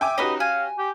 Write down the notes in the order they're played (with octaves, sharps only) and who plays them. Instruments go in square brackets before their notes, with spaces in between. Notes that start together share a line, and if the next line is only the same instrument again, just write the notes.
[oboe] E5 [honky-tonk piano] G5 G#5 D6
[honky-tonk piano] C#4 F#4 G4 [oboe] D#4 [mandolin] B4 D#5
[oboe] F5 [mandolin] G#5
[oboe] G4